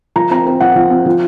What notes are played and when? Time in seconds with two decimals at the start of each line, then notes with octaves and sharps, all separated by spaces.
0.16 F3 A#5
0.31 C4 A#5
0.47 C4
0.60 F3 F#5
0.75 F3
0.91 C4
1.06 F3